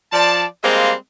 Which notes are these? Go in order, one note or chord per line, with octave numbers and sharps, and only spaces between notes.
F3 D5 A5
G3 G#3 A#3 C4 D#5 F5